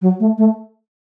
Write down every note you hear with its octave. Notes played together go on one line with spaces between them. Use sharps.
F#3
A3
A3